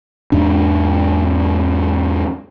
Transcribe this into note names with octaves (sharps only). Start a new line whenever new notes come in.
E2 G#2 D4